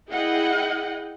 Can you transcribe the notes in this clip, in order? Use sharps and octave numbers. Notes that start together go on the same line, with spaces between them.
E4 G#4 D#5 F#5 G5